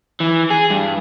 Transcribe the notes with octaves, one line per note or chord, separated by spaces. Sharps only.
E3
G#4
G2